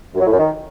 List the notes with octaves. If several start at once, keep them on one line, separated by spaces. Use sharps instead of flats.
F#2
F#3
A2
F#2
D#3